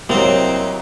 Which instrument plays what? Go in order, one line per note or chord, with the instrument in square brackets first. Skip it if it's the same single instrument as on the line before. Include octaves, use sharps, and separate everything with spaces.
[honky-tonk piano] C2 F#3 [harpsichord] A#3 D#4 [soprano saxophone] C4